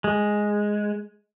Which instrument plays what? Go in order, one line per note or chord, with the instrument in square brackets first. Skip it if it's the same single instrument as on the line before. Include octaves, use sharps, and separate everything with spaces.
[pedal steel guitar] G#3